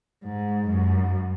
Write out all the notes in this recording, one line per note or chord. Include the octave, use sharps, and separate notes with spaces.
G#2
F#2